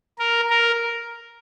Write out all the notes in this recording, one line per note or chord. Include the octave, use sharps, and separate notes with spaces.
A#4
A#4